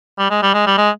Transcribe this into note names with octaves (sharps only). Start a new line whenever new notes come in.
G3
G#3
G3
G#3
G3
G#3